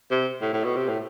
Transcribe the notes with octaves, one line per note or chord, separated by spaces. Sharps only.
C3
A2
A2
B2
C3
A2